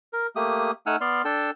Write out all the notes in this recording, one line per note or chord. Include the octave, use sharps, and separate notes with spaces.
A#4
A3 A#3 G4 D#6
A3 D#4 F#5 G#5 E6 F6
B3 D5 C6 F6
D4 A4 G5 A5